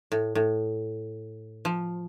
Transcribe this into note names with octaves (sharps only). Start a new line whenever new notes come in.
A2
A2
F3